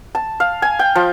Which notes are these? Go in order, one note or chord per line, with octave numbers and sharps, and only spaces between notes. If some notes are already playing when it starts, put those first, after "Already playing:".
A5
F5
G#5
G5
F3